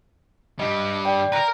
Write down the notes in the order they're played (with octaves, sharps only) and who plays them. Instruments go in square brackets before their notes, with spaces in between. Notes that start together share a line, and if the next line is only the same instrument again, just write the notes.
[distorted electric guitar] G2 G3 [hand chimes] D#5
[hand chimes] D5 G5
[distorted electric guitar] A#4 B4 [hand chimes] A#5 A#6